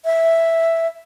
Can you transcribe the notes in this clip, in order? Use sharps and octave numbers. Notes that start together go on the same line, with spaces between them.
E5